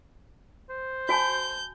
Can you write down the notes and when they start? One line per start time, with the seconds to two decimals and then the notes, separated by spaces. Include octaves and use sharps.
0.70 C5
1.09 F#4 G#5 A5 G6